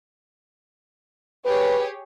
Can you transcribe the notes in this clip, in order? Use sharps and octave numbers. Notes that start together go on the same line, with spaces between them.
G4 G#4 B4 C#5